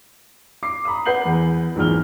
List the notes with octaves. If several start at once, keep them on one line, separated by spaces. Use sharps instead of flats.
D6 C7
A#5 B5 D#6
B4 F#5 G6 C7 F#7
E2
A#1 E2 G#2 F6 G7